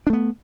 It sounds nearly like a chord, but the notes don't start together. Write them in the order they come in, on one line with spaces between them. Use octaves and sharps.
D4 A3 B3